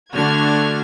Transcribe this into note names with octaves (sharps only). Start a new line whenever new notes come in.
D3 A3 D4 F#4 F6 G#6